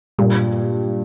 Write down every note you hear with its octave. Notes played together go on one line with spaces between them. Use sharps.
G2 A#2